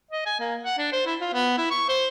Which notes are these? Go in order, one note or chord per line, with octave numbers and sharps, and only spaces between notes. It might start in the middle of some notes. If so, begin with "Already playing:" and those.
D#5
G#5
A#3
F#5
D4
C5
E4
F4
B3
E4
C#6
C5